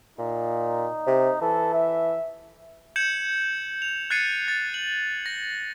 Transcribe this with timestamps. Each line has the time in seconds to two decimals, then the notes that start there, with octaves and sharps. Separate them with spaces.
0.18 A#2 D#4
1.07 C3
1.41 E3 A4
1.74 E5
2.96 G6 G#6 C#7 E7 F#7
3.82 F7
4.10 F#6 G#6 A6 C7 C#7 D#7
4.48 A6
4.74 F#7
5.26 A#6